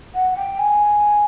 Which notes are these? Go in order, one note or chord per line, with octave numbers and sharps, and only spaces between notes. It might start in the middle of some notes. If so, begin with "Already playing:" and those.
F#5
G5
G#5